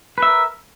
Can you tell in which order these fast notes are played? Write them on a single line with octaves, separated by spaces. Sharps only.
B4 E5 A#4